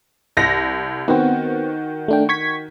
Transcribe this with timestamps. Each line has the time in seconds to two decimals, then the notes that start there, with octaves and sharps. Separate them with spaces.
0.37 C2 A#6
1.08 D#3 B3 C4 F#4
2.08 A3 D4 G5
2.29 C#6 G#6 B6